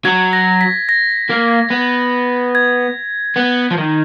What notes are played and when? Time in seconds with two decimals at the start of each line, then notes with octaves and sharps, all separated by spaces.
0.05 F#3 G#6
0.33 A#6
0.61 B6
0.89 A#6
1.30 A#3
1.71 B3
2.55 G#6
3.37 B3
3.71 F3
3.78 D#3